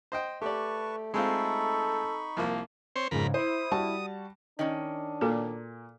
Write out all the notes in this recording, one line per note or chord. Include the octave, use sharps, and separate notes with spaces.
C5 D#5 G5
A3 G4 B4 D5 A5 C#6
G#3 C4 D#4 F4 A4 B5 C#6
C2 F3 A#3
C4 C5 C#5
F2 G#2 C#3 A#4 B5
E4 C5 D#6
G3 F#4 A5
D#3 C#4 D4 D#5
A#2 F#4 A4 A#4